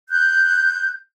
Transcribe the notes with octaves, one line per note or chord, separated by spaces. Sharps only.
F#6 G6